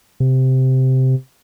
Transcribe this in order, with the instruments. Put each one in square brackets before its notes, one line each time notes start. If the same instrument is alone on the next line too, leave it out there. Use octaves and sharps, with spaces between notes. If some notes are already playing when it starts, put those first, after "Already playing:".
[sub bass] C3